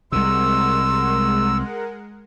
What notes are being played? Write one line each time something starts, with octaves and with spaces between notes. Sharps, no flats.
C2 C3 G#3 A#4 F#5 C6 E6